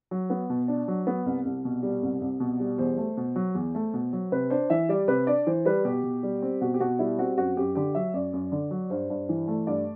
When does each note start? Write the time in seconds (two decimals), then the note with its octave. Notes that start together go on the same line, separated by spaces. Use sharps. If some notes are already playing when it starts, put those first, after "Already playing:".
0.11 F#3
0.30 B3
0.50 B2
0.68 D4
0.88 F#3
1.07 B3
1.26 C2
1.45 C2
1.65 B2
1.83 G3
2.03 C2
2.21 C2
2.40 B2
2.60 G3
2.78 E2 C5
2.97 A3
3.17 B2
3.36 F#3
3.55 E2
3.75 A3
3.94 B2
4.13 F#3
4.32 C3 B4
4.50 D4 C5
4.70 E3 E5
4.89 G3 D5
5.08 C3 B4
5.27 D4 D5
5.47 E3 C5
5.65 G3 B4
5.85 B2 G4
6.04 B2
6.23 G3
6.42 C4
6.61 B2 F#4
6.74 G4
6.80 B2 F#4
6.99 G3 E4
7.18 C4 F#4
7.38 F#2 F#4
7.57 F#2 G4
7.75 D3 G4
7.95 F#3 E5
8.14 F#2 D5
8.33 F#2
8.52 D3
8.71 F#3
8.90 G2 C5
9.10 G2
9.29 E3
9.48 A3
9.67 G2 D5